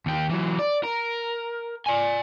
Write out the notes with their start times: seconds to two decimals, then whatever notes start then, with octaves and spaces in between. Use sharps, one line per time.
0.06 D#2 G4
0.29 E3 F#3
0.59 D5
0.84 A#4
1.86 D5 G#5